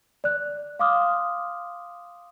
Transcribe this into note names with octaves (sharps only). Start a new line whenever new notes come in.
D5 F#6
F5 C6 D6 D#6 F6